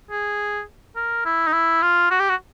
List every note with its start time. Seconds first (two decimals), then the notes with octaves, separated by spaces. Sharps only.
0.10 G#4
0.96 A#4
1.25 E4
1.47 D#4
1.53 E4
1.82 F4
2.11 F#4
2.20 G4
2.29 F#4